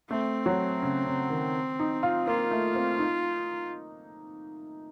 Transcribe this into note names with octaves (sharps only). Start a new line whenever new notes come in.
A3 C4
F#3
C#3
C#3
D#3
D#4
F4
A#3 F4
A3
C4
D#4